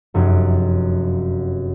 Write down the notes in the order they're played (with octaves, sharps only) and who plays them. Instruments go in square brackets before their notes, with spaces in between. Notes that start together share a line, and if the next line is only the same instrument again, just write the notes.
[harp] F1 F#2